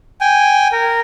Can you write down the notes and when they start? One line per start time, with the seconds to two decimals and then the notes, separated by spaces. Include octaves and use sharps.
0.21 G5 G#5
0.72 A#4